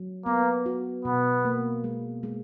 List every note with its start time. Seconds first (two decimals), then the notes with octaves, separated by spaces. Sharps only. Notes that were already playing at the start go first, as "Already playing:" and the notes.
Already playing: F#3
0.26 A#3 B3
0.66 F#4
1.05 B2 B3
1.45 A#3
1.84 G#3
2.23 G#3